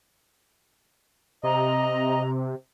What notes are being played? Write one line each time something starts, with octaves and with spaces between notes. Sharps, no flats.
C3 D#5 A#5